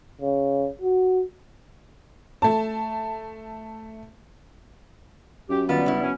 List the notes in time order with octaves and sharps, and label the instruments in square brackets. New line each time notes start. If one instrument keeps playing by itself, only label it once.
[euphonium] C#3
F#4
[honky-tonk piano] A3 A5
[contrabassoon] F#2 [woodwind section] G4
[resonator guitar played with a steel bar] D#3 F4 [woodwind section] G3 [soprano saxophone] B3
[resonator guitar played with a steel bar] C#3 E4
[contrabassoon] F#2 [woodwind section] C#4